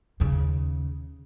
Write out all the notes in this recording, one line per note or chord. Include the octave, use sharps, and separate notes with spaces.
D#2 C#3